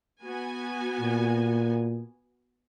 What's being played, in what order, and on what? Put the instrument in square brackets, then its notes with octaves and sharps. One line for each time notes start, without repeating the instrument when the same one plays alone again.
[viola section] B3 F#4 G#5
[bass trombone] A#2